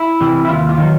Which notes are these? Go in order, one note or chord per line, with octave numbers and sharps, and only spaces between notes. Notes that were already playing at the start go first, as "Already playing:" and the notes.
Already playing: E4
C3 E3 G3
E4
D#2 F4
F4
D#3 F#3